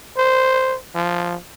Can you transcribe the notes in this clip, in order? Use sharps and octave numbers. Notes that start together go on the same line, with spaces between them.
C5
F3